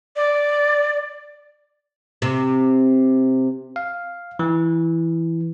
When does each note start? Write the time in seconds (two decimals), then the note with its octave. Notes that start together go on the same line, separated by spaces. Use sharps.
0.16 D5
2.22 C3
3.76 F5
4.39 E3